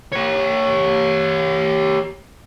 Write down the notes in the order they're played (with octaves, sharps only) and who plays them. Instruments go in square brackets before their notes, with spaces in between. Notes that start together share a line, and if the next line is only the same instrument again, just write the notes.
[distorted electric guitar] G4 C#5